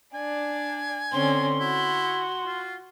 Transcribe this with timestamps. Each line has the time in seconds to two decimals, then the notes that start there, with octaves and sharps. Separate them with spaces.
0.14 D4 D5 G#5
1.12 D3 C4 C#4 C6
1.60 E4 F#4
2.46 F4